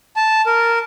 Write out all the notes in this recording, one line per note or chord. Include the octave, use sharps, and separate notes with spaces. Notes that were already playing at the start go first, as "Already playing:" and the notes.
A5
A#4